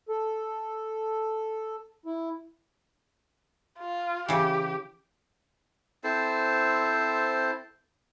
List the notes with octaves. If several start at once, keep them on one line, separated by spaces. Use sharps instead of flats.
A4
E4
F4
C#3 E3 G4
C4 E4 A4 C5